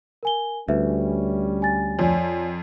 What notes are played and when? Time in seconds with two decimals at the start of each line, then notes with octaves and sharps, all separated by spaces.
0.23 A#4 G#5 G7
0.69 D2 G3 C#4 B4 E5
1.62 G#5 A6
1.99 F2 C#5 D5 G#5